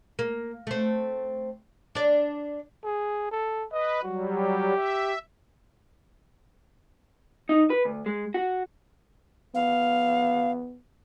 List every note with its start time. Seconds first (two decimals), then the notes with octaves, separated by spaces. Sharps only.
0.19 A#3
0.67 A3 C4
1.95 D4 D5
2.84 G#4
3.31 A4
3.72 B4 D#5
4.03 F#3 G3 F#4
4.36 G4
4.75 E5
7.49 D#4
7.70 B4
7.85 D2
8.06 G#3
8.34 F#4
9.55 B3 F5